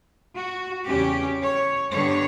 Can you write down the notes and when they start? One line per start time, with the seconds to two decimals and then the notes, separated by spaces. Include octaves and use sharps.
0.36 F#4
0.88 E2 C#3 G3 C#4 G4
1.42 C#5
1.93 G2 D3 G3 B3 D4 C#5